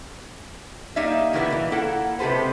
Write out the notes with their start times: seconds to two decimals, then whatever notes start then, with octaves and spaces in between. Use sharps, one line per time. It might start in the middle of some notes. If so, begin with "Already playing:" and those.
0.96 G3 A#3 D#4 D5 E5
1.33 B2 E3 A#3 B3 E4 B4
1.50 A#2 E3
1.72 A#3 E4 A4 F#5
2.19 C3 G#3 G4 A4 B4 C5